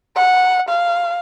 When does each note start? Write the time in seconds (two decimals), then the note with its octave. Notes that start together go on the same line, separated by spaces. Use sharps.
0.16 F#5
0.69 F5